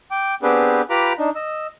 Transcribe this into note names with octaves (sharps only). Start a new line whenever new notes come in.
G5 D6
B3 C4 D4 G4 G#4 B4
F4 G4 B4 A#5 B5 D6
D4 D#4
D#5 E6